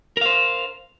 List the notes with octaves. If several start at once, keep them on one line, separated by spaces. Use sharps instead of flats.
A#4 C5 F5